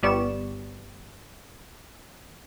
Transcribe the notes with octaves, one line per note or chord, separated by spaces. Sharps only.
G1 G3 B3 D5 C#6 E7